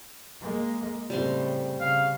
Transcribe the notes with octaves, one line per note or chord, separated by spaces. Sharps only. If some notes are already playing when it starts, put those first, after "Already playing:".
G#3 A#3
A2 C#3 G3 C4 C6
C#3 F5